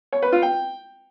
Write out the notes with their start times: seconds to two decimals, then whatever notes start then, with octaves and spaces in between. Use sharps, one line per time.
0.12 C#5
0.22 B4
0.32 F4
0.42 G5